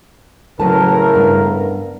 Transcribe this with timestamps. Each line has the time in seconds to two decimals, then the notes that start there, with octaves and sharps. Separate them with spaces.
0.60 A2 C#3 F#3 A#4 B4 A5
1.15 G2 B3